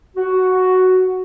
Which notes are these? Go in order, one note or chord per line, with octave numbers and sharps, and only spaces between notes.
F#4